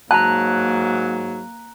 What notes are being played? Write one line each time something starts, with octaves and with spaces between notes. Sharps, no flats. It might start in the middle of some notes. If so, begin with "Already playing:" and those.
G#2 F#3 A#3 A5 A#5 F#6